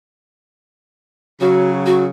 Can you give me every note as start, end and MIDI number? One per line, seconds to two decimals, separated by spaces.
1.41 2.10 49
1.41 2.10 54
1.41 1.71 66
1.86 2.04 66